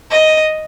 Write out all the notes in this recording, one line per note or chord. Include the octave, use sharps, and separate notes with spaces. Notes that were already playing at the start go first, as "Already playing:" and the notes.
D#5